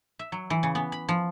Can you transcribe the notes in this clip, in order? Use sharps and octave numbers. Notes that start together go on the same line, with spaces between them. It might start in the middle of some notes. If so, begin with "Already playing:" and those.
E5
F#3
E3
C#3
B3
B5
F3